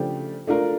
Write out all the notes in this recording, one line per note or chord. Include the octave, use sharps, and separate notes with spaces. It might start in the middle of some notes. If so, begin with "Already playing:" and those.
Already playing: C#3 F3 A3 D4 G4
A3 D4 F4 A#4